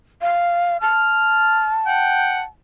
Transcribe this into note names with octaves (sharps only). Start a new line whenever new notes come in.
F5
A5 F6
F#5 G5